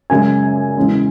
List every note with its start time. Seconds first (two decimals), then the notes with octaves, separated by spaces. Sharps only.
0.10 F#2 C#3 G#3 G#5
0.77 E2 C#3 G#3 C#4